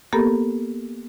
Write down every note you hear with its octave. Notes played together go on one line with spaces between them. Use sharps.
A#3 B3 G4 A4 A#4